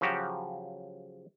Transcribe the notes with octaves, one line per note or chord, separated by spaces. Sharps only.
C#3 F3 F#3 F#4 G4